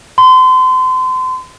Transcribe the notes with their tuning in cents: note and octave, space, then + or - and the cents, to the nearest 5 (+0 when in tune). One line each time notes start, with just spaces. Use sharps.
C6 -35